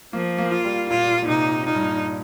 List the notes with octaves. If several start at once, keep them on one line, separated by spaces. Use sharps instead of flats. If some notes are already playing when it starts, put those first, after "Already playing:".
F3 A#3
A#3
F4
G3
A#2 F4
A#2
C3 D#4
A#2 D#4
G2
A#2